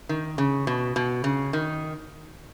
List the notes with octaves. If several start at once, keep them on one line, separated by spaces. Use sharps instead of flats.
D#3
C#3
B2
B2
C#3
D#3